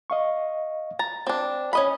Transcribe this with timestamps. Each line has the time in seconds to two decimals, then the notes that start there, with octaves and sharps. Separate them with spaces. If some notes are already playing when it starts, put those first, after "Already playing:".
0.10 D#5 F5 C#6
0.99 A#5 A6
1.27 C4 D4
1.73 C#4 D#5 B5